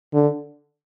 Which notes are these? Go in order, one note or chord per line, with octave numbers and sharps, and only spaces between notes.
D3